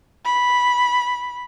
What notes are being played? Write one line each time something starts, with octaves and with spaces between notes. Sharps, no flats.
B5